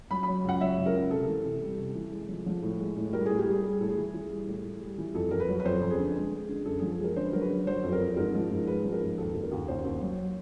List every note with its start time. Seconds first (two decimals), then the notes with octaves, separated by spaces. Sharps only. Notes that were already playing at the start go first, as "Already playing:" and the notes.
0.11 F#3 B5
0.23 F#3 B5
0.44 C#2 F#5
0.61 F#3 E5
0.78 C#2
0.86 A#4
0.95 C#2
1.11 C3 A4
1.28 E3
1.45 C3
1.62 G3
1.78 C3
1.95 E3
2.12 G#3
2.29 F3
2.46 F3
2.62 A2
2.79 G#3
2.96 A2
3.13 G3 A#4
3.26 A2 G#4
3.39 G4
3.46 G3 G#4
3.63 G3 G#4
3.80 A2 A4
3.88 G#4
3.97 E3
4.14 E3
4.30 G3
4.47 A2
4.64 A2
4.81 G3
4.98 E3
5.14 F2 A4
5.31 F2 A#4
5.40 B4
5.48 F#3
5.60 B4
5.65 F2 C5
5.81 F2
5.90 G#4
5.99 D3
6.15 G#3
6.31 G#3
6.49 D3
6.65 F#2 A4
6.78 F3 G#4
6.91 A4
6.99 G#3 A#4
7.16 D3 C5
7.25 B4
7.33 F#3 A#4
7.41 B4
7.49 D3
7.67 F#3 C5
7.83 F2
7.92 A#4
8.00 F2
8.17 G#2 A#4
8.34 F3
8.51 G#2
8.67 G#3 B4
8.85 F3
8.92 A#4
9.01 G#2
9.18 D#2 A4
9.34 D#2
9.43 A#4
9.52 D#2
9.68 D#2 C5
9.85 D#2
10.01 F#3